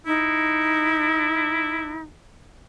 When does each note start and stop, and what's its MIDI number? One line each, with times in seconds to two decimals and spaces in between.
0.06 2.01 63
0.06 2.05 64